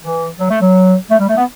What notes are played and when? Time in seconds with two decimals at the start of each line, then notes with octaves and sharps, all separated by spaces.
0.03 E3
0.39 F#3
0.50 A3
0.62 F#3
1.10 A3
1.19 G3
1.28 A3
1.37 B3